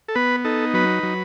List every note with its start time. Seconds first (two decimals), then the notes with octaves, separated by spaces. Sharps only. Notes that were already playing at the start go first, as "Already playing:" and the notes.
0.08 A4
0.15 B3 B4
0.45 D#4 A4
0.74 F#3 B4
1.03 F#3